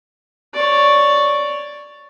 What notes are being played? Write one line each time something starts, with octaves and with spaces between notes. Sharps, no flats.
C#5 D5